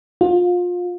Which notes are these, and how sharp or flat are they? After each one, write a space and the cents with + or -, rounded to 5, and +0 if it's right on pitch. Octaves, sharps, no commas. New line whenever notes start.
F4 +25